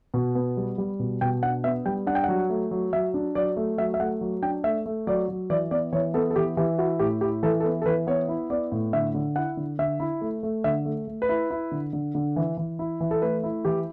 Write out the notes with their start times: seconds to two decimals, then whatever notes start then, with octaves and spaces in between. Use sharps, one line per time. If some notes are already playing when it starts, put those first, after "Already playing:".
0.14 B2
0.35 B3
0.57 G3
0.78 G3
0.99 B2
1.21 B2 G5
1.43 D4 F#5
1.64 B3 E5
1.86 G3 G5
2.06 D4 F#5
2.15 G5
2.24 F#3 F#5
2.50 A3
2.71 F#3
2.93 F#3 E5
3.14 D4
3.35 F#3 D5
3.57 A3
3.78 F#3 E5
3.94 E5
4.00 A3 F#5
4.21 F#3
4.42 D4 G5
4.64 A3 E5
4.86 A3
5.07 F#3 D5
5.28 F#3
5.50 E3 D5
5.71 B3 D5
5.92 E3 C#5
6.14 B3 A4
6.31 A4
6.36 E3 G4
6.57 E3 G4
6.78 E4 F#4
6.99 A2 G4
7.21 E4 G4
7.43 E3 A4
7.60 A4
7.64 B3 B4
7.82 A4
7.86 E3 B4
8.07 B3 C#5
8.29 E4
8.50 B3 D5
8.72 A2
8.93 D3 E5
9.14 D3
9.36 E4 F#5
9.57 D3
9.79 D3 E5
10.00 E4
10.21 A3
10.43 A3
10.64 D3 E5
10.86 A3
11.07 A3
11.22 B4
11.29 E4
11.50 E4
11.71 D3
11.93 D3
12.15 D3
12.36 E3
12.57 E3
12.79 E4
13.00 E3
13.11 A4
13.22 A3 B4
13.44 E4
13.65 E3 G4